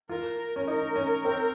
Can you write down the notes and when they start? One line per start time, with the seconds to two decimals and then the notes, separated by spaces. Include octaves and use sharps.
0.09 F4 A#4
0.56 C#4
0.67 D#4 A#4
0.96 C#4
1.25 C4